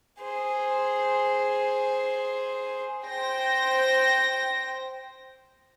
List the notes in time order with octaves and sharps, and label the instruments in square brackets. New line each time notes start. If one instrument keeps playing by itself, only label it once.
[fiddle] G#4 C5
[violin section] C5 G5 A#6